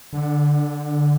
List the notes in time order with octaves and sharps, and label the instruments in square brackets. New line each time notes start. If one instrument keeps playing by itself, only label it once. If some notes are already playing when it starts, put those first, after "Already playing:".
[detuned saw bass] D3